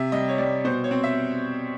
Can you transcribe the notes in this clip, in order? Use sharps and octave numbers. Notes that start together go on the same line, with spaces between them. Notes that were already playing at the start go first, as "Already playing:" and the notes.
Already playing: C3 E5
G3 D#5
C#5
G3 D5
B2 C5
C#5
C4
E5